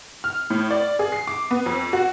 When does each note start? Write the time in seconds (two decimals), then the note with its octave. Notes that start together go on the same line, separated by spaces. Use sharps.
0.24 F6
0.50 A2
0.71 D5
0.99 G#4
1.12 C7
1.27 D6
1.51 B3
1.66 F2
1.93 F#4